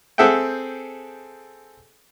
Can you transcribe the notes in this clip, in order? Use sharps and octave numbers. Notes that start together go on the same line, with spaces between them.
C4 G#4 A4 E5 F#5 G5